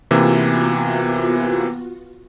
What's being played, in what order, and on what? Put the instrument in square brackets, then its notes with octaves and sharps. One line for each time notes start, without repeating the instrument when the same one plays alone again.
[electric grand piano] C3 E3 A#3 [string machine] B3 F4 F#4